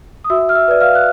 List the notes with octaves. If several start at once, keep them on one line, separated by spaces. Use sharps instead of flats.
D#6
F#4 E5 E6
F6
E5 E6
B4 D5
F5 F6
F#6